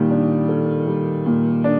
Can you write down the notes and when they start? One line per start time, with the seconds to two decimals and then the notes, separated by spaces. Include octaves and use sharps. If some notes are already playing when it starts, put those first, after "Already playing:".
Already playing: A#2 D#3 G3
0.10 D4
0.49 A4
0.87 G3
1.26 A#2
1.64 D4